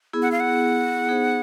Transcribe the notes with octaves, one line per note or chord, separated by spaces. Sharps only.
B3 E4 G#4
F#5
F5
F#5
B3 D#4 G#4 C5